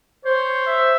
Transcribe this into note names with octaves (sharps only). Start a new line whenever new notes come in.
C5 C#5
E5